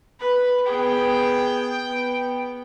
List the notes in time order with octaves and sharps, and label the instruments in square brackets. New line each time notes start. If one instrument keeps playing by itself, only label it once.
[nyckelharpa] B4 B5
[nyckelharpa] B3 G#4 [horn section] G5
[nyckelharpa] B3